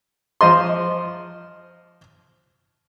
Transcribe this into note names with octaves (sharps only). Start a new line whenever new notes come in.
F3 D#5 C6